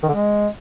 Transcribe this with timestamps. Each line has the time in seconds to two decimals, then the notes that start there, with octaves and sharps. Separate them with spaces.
0.03 D#3
0.08 D3
0.14 G#3